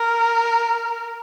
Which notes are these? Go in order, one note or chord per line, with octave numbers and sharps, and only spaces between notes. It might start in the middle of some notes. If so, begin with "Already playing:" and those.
Already playing: A#4